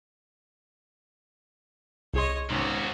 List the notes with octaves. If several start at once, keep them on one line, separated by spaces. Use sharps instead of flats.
C2 G#4 C#5 D#5 C6
G#1 G#2 C3 B3 C#4 F#4